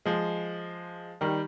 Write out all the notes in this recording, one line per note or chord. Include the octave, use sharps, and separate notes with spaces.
F3 G#3
D#3 G3